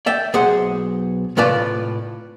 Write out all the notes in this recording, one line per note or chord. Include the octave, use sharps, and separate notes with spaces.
D5 E5 G5
B1 G#4 C5 F#5
A2 C3 F4 B4 D5 A5